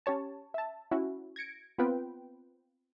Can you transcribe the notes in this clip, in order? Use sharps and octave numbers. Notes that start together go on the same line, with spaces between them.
C#4 G4 C#5 A5
E5 A5
C#4 E4 F#4
G#6 A#6 C#7 D7
B3 C4 F4 B4 G5